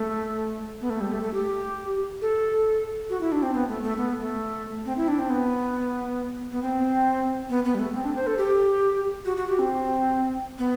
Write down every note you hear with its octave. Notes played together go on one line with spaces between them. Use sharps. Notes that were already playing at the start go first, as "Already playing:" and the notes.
Already playing: A3
B3
A3
G3
A3
A3
G4
A4
F#4
E4
D4
C4
B3
A3
A3
B3
A3
C4
E4
D4
C4
B3
B3
C4
B3
B3
G3
A3
C4
D4
C5
A4
G4
F#4
F#4
G4
C4
B3